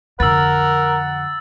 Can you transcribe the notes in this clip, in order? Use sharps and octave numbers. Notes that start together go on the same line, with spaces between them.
F2 D3 A#4 F#5 E6 A6